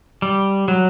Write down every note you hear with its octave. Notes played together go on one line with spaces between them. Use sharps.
G3
F#3